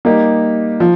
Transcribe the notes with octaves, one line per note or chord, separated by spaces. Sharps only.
G3 A#3 D#4 G4
F3